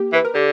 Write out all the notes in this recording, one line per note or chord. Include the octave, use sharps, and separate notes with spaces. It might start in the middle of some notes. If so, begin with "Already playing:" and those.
Already playing: A#3 G4
E3
B4
A#4
D3 G4